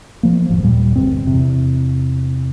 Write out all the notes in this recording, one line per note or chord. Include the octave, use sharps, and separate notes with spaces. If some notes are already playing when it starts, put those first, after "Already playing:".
F3 A#3
E1 D#2 G#2 F3
D#2 A#2 G3
G1 D2 G2 C4
E2 C3